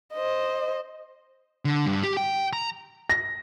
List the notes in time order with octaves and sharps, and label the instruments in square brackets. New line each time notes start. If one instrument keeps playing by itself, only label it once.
[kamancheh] C5 D#5
[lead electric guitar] D3
G2
G4
G5
A#5
[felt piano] A#6